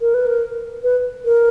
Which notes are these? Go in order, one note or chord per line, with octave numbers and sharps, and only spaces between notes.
A#4
B4
A#4
B4
A#4